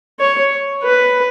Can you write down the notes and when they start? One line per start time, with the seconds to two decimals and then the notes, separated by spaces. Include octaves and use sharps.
0.20 C#5
0.83 B4